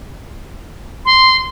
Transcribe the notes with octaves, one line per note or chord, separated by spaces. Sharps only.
C6